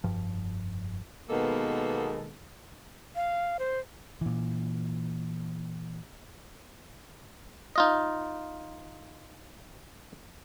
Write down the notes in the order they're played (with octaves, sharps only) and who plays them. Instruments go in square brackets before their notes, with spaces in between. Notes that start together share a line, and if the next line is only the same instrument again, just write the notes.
[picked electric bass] F1 G2 F3
[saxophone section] B2 D#3 G#3 A#3 B3 A4
[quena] F5
C5
[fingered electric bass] A#2 E3
[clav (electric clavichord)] D#4 F4 D#5